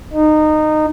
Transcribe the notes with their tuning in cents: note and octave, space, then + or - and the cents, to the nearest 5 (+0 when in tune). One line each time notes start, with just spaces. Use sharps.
D#4 -20